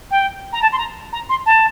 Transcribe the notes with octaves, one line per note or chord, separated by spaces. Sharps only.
G5
A#5
A5
C6
A#5
A#5
C6
A5